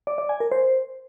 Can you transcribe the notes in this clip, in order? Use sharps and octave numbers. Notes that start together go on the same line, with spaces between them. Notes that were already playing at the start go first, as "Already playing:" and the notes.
D5
D5
G#5
A#4
C5